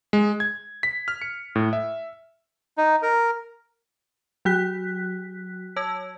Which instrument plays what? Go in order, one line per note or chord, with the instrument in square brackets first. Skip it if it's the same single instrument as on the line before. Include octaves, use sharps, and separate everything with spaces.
[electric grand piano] G#3
G#6
B6
F6
C#7
A2
E5
[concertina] D#4
A#4
[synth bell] F#3 F#4 F#6 B6
C#5 A5 E6 G#6